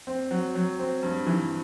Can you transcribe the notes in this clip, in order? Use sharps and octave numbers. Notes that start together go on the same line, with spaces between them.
C4
F#3
F#3
C4
G2
E3